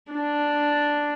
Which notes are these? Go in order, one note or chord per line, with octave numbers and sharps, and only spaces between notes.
D4